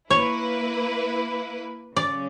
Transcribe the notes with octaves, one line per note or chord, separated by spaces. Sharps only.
A#3 E4 B4 C#5
C#3 F#3 C#4 D5